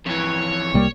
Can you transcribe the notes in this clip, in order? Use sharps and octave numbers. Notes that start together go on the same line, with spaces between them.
F2 E3 C#5
C2 G3 A#3